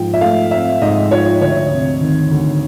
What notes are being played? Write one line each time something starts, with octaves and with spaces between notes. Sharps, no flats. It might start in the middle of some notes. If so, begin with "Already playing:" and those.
Already playing: G#2 F3 G5
E5
A3 F5
C4 E5
G#2 D#5
F3 C#5
D2 C#5
C3
D#3
D2